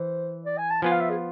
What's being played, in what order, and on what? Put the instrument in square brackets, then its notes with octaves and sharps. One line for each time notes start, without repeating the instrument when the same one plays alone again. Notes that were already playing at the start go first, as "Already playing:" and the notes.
Already playing: [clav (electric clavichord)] E3 [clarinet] C5
[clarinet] D5
G#5
A5
[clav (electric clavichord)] F3 B3 F4 [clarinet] G#5
[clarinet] F5
E5
G#4